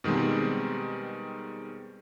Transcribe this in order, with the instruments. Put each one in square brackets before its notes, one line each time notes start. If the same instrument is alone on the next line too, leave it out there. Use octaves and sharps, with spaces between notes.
[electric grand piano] B2 D#3 G3 G#3 C4